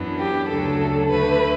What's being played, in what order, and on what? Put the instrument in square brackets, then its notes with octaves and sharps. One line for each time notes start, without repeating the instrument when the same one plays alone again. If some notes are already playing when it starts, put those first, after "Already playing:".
Already playing: [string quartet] F#2 E3 B3 D4
[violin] G4
[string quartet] D2 C#3 F#3 A3 D4 [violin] A4
[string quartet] D2 D3 A3 [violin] B4